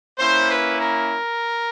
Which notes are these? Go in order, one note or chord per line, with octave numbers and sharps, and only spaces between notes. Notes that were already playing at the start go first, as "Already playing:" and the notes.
A#3 C#4 E4 C5
B4
A#4